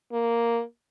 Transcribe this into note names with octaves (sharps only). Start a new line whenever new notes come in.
A#3